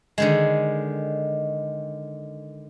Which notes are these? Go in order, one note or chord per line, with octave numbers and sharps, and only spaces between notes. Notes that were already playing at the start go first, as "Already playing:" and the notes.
D3 D#3 G#3